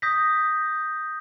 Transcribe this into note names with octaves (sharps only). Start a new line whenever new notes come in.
D#6 G6 A#6 B6